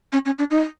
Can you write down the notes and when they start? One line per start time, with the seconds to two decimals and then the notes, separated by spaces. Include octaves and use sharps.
0.13 C#4
0.25 C#4
0.39 D4
0.51 D#4